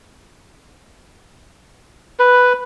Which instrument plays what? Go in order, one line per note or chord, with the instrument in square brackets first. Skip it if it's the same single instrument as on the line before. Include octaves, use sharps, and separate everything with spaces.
[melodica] B4